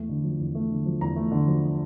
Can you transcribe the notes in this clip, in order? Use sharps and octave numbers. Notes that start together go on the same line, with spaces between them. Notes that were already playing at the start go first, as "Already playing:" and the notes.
Already playing: E2 A3
D3
F3
E2
A3
D3
F3
E2 A#5
A3
D3
F3